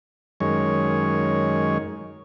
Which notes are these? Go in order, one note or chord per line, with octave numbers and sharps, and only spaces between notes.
F#2 D#3 G#3 C#5